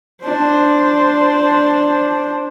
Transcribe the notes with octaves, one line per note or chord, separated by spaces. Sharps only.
D4 C5